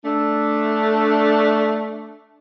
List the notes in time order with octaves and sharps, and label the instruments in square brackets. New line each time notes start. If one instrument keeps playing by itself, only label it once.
[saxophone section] A3 D4